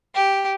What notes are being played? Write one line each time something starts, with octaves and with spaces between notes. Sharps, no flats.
G4